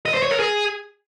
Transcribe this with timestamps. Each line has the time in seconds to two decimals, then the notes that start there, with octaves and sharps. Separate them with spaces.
0.06 D#5
0.14 C5
0.23 C#5
0.31 A#4
0.39 G#4